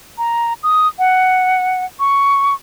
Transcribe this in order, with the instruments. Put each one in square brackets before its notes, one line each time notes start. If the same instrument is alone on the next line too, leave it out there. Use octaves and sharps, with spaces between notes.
[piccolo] A#5
D#6
F#5
C#6